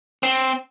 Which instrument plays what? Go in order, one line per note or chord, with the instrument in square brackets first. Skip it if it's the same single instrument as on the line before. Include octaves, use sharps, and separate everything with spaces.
[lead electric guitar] C4